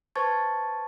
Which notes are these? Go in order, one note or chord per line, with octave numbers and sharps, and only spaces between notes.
B4 C5 A5 C#6 G#6 A6